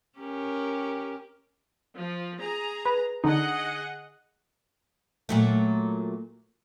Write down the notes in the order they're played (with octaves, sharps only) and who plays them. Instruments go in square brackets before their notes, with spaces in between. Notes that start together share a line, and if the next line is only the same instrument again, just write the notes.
[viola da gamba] C#4 G4 A#4
[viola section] F3
G#4 A#5
[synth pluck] B4
[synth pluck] D3 D#4 [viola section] G#4 D#5 F#5
[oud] A#2 F#3 A3